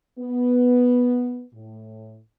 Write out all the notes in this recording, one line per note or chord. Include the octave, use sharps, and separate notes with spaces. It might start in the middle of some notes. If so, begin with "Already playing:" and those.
B3
A2